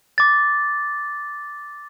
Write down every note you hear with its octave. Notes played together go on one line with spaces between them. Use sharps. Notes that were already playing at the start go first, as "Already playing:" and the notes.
D6 A6